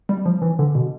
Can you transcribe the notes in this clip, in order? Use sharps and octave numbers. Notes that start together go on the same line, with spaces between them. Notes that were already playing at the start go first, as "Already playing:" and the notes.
G3
F3
E3
D3
B2